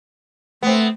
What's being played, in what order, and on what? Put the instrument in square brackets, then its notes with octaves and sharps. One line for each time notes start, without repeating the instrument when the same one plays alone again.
[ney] A3 [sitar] B3 C4